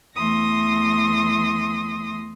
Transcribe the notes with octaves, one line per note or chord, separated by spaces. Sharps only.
E2 E3 A3 C6 D#6 A#6